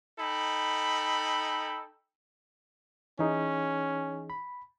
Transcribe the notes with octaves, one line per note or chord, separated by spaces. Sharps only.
D#4 A4 G5 B5
E3 C#4 D#4 G#4
B5